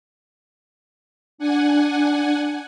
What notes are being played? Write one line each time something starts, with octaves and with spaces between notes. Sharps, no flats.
D4 F#5 G#5